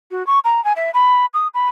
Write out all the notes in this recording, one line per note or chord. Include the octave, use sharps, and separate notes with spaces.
F#4
C#6
A#5
G#5
E5
B5
D#6
B5